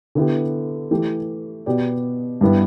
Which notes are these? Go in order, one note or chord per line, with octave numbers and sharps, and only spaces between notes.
D3 B3 E4 G4
E3 A3 G4
B2 B3 G4 D5
G2 G3 B3 E4